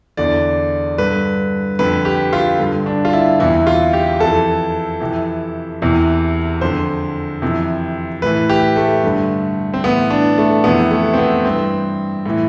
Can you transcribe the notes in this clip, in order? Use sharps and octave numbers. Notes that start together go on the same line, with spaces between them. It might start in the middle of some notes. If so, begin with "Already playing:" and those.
E2 D3 D5
G2 D3 B4
F2 D3 B4
G4
F4
G2 D3
D4
F4
E4
E2 C3 E3 E4
F4
G4
F2 E3 A4
F2 C3 E3
E2 C3 E3
F2 D3 C5
F2 C3 E3
A2 E3 B4
G4
A3
G2 D3
C4
A2 E3 B3
D4
A3
F2 C3 E3 B3
A3
C4
B3
G2 E3 C4
A2 E3